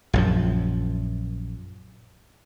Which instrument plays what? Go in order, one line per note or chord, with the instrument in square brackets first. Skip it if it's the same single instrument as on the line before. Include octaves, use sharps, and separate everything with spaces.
[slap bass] A#1 F#2 F3